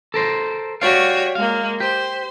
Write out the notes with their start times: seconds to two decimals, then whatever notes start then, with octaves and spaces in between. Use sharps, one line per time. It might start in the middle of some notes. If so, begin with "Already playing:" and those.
0.14 A4 A#4 C5
0.82 F#4 G4 C#5 D5 F5
1.35 G#3 A#3 F5
1.80 G4 C5